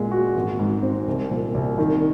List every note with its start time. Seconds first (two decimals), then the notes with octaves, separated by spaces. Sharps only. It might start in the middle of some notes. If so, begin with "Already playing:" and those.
Already playing: A#2 G#3
0.11 F#4
0.35 G#1
0.59 G#2
0.82 C4
1.07 C2
1.31 A#2
1.54 C2
1.78 D#3